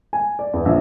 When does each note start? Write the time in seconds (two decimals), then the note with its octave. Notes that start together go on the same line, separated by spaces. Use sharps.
0.13 G#5
0.39 D5
0.54 E2
0.65 A#1